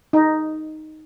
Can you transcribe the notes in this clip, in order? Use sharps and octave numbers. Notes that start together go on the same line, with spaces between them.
D#4